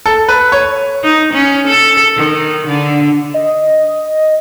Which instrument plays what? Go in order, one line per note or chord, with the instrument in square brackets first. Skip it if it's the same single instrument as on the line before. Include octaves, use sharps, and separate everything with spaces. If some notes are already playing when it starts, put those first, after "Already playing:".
[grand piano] A4
B4
C#5
[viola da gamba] D#4
C#4
A4
D#3
D3
[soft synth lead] D#5